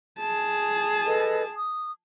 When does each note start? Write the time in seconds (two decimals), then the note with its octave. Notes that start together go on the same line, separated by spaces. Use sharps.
0.20 G#4 A5
1.05 A4 B4 D#5
1.57 D#6